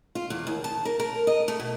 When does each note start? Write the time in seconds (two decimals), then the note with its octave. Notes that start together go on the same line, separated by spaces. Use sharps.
0.15 F4
0.30 E2
0.47 D#2
0.64 A5
0.85 A#4
1.00 A#4
1.27 D#5
1.48 A3
1.60 B2